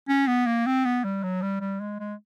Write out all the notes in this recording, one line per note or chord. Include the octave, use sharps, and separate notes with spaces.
C#4
B3
A#3
C4
B3
G3
F#3
G3
G3
G#3
G#3